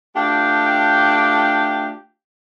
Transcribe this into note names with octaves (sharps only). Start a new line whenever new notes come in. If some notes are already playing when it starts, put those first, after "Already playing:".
A3 D4 F4 G4 G5